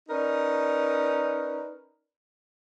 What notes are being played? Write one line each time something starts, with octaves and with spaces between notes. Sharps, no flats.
C#4 D#4 A#4 B4 D5